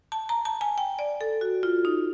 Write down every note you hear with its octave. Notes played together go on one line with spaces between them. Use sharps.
A5
A#5
A5
G#5
G5
D5
A4
F#4
F4
D#4